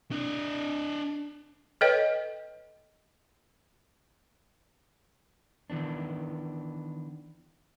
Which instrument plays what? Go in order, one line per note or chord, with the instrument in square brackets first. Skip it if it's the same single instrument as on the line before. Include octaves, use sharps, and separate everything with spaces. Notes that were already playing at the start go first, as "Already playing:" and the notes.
[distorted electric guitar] D4 D#5
[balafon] A4 B4 C#5 D#5 G5
[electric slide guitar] D#3 E3 B3 D4